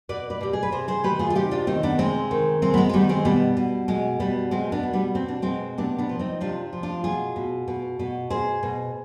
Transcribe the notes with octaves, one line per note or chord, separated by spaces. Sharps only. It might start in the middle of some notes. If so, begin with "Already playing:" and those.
B2 B4 D5
B4 D5
B2 G4
G#4
B4
C3 G#4 C5
G#4 C5
D#3 G4 B4
F4 G#4
F4
C3 D#4 G4
D4 F4
D#3 C4 D#4
B3 D4
C3 G#3 C4
D#3
C3 G#3 C4
B3
G#3
G#3
D#3 G3 B3
G#3 C4
B2 G3 B3
B2
B2 G#3
B2 G3 B3
B2 G#3 C4
B3 D4
B2
G3 B3
B2 C4
D4
B2 G#3 C4
C3 B3 D4
B3 D4
F3
C4 D#4
C3 D4 F4
F3
D4 F4
B2 F4 G#4
B2
B2
B2
B2 G#4 C5
B2